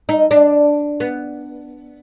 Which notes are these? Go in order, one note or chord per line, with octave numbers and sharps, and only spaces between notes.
D#4
D4
B3